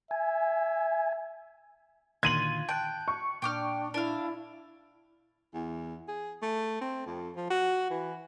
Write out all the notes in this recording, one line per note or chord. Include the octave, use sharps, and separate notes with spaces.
E5 G#5
A#2 D3 D#3 F4 G#6 D#7 F#7
G5 A5 F#6
C#6
A#2 D4 G5 D6 F6
D4 E4 F5
E2
G#4
A3
C4
F2
F3
F#4
E3